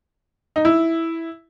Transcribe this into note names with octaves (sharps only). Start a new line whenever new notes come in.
D#4
E4